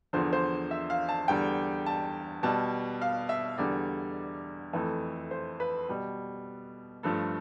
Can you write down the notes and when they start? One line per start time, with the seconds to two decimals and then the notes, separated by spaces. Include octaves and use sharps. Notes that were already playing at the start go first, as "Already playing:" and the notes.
0.13 E2 D3 F3 C5
0.33 C5
0.71 E5
0.90 F5
1.09 A5
1.28 E2 D3 G3 G5
1.86 A5
2.43 B2 G3 A5
3.01 F5
3.29 E5
3.58 E2 D3 G3 D5
4.73 F2 E3 A3
5.31 C5
5.60 B4
5.89 B2 G3
7.03 G2 F3 A3 A4